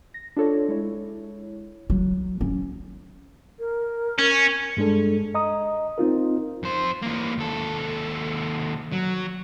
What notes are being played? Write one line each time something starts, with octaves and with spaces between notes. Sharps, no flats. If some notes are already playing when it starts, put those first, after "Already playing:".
A#6
D4 F4 A4 C#5
G#3 E4 C#5
F#3
C#4
A#4
C#4
G2 G#3 D4 A4
D#5 A#5 D#6
C4 D#4 F4 A#4
F2 C5
E3 A#3
D#2 A4
F#3